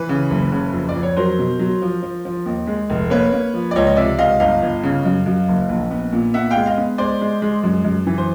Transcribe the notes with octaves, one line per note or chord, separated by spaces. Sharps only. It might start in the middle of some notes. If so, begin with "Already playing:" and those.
Already playing: E3 B4
C#3
F#1
C#3
F2
D5
F2
C#5
F#3 A#4 C5
B2
F#3
F3
F3
F3
D#2
G#3
F1
A#3 B4 C#5
A#3
F3
D5
C#2 C#5 D#5
D#5
C3 D5 E5
C#2 D#5 F5
G1 D#5 F5
G1
C#3
F#2
F#2
F#1
A#1
B3
A#2
B3 E5 F#5
F5 G5
G#3
D#5 F5
B3
G#3 C5 D5
G#3
G#3
F#2
F#2
E3
C5